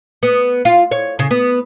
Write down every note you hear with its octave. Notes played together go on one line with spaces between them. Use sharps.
B3
F4
C#5
C#3
B3